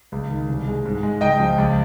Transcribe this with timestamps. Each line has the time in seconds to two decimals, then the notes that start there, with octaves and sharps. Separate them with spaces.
0.12 C#2
0.30 D#3
0.48 C2
0.67 G#3
0.85 G#2
1.03 G#3
1.21 C#2 D#5 G5
1.40 F3
1.58 C#2